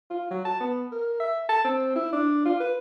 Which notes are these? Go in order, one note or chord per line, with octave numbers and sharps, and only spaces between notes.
F4
F#3
A5
B3
A#4
E5
A5
C4
E4
D4
F4
B4